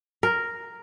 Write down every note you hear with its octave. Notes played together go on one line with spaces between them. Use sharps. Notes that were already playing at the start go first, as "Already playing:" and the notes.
A#4